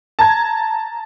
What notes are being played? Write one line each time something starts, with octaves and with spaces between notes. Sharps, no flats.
A5 A#5 G#6